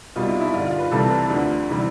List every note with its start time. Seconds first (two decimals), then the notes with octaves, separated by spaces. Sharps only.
0.16 C2 B2 G3 F4
0.28 E4
0.41 E4
0.53 G2 D3 F3 F4
0.67 F4
0.78 B4
0.91 C2 C3 E3 G3 A4
1.10 B4
1.30 D2 D3 F3
1.70 C3 E3 G3